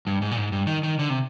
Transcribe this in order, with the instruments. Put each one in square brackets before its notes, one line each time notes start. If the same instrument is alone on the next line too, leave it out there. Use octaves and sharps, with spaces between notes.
[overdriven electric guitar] G2
G#2
A#2
G#2
G2
D#3
D#3
D3
C3